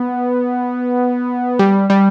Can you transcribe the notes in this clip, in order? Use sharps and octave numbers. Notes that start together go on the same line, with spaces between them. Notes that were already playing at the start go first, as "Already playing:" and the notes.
Already playing: B3
G3
G3